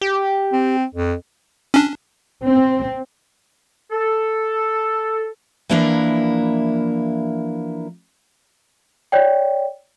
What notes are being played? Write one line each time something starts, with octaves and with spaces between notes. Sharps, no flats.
G4
C4
F2
C#4 D4
C4
A4
E3 F3 A#3 D4 E4 A#4
C#5 D5 G5